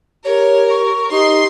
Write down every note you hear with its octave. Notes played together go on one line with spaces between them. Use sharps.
G4 A#4 C#5
C#6
D#4 G4 C6